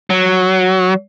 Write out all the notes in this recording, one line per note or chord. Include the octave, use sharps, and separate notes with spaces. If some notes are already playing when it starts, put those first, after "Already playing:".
F#3